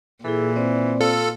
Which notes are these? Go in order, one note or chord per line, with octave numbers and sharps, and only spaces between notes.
A#2 E3 E4 G#4 A4
C4 C5 D5
F4 A4